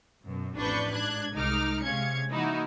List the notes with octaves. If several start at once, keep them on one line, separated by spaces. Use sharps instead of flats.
F#2 B2
A1 F2 D4 B4 C#6 G6
G#2 D4 F#6 G#6
C2 G#3 D#4 D6 F6
C3 G#3 C#4 F5 G#6 C#7
E3 A#3 D#4 E4 F#4